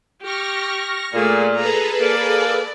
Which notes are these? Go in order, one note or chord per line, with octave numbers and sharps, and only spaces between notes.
G4 C#6 F6 A#6
A#2 A3 G#4
G#4 A4 B4 A#5
A#3 D5